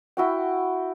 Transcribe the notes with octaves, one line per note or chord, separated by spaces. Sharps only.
E4 F#4 G5